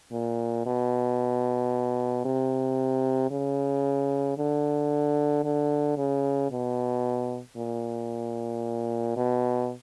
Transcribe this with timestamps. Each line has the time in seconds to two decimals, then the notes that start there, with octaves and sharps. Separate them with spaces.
0.12 A#2
0.66 B2
2.25 C3
3.31 C#3
4.38 D3
5.44 D3
5.97 C#3
6.51 B2
7.57 A#2
9.16 B2